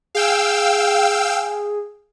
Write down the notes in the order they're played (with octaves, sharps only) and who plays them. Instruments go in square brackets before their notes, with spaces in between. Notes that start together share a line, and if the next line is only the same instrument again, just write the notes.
[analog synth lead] G#4 [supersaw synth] F5 G5 E6